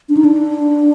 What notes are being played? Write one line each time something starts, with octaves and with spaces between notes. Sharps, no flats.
D4
D#4
D4